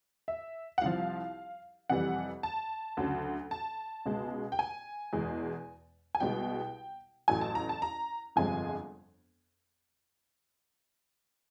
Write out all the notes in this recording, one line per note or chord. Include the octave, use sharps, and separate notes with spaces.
E5
F#5
C2 C3 F3 F5
F2 C3 E3 G3 F#5
A5
D2 C#3 F#3
A5
C#2 B2 G#3
G5
G#5
E2 B2 G#3
G#5
C2 B2 G#3 G5
A1 A2 F#3 G#5
A5
A#5
A5
A#5
G1 F2 C3 F3 G#3 G#5